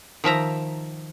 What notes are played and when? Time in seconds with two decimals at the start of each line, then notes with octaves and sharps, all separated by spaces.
0.24 D#3 F3 E5 A#5